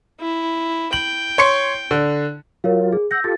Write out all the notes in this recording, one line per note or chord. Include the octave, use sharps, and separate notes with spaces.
E4
G5 F#7
C#5 C6 C#7
D3
F#3 F4 A#4 C#5 F5
G#4
F#5 E6 G6 A#6
F4 G4 A4 A6